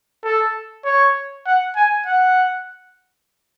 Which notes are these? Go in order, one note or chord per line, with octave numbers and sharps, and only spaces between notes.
A4
C#5
F#5
G#5
F#5